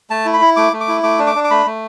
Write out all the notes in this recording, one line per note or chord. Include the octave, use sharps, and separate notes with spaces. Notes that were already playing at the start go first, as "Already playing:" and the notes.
A3 A5
E4
B5
E4
A3 D6
A3
D6
E4
A3 D6
D4
D6
D4
D6
A3 B5
A3